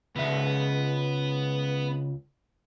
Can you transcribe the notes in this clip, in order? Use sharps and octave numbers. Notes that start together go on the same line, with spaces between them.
C#2 B3 E5